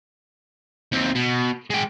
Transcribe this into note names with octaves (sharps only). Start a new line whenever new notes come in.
D#2 C4
B2
G#3 G5